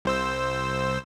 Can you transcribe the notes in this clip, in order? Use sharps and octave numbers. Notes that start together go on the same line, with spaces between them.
C2 C5 E6